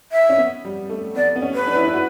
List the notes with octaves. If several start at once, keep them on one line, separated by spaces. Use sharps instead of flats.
E5
C#4
B3
G3
A3
B3 D5
B3
C#4
B4
D4
E4
D4
E4
F#4